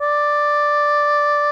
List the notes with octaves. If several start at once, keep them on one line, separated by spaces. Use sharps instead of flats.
D5